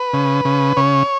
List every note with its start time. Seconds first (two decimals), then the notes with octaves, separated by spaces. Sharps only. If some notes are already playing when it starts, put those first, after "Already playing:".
Already playing: B4
0.14 C#3
0.45 C#3
0.77 C#3 C#5